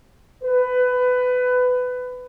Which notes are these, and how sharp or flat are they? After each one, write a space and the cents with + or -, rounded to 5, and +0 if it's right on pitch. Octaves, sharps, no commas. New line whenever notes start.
B4 +20